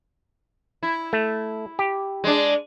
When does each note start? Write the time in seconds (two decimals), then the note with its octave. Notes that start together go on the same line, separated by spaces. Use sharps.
0.83 E4
1.13 A3
1.79 G4
2.24 G#3 D4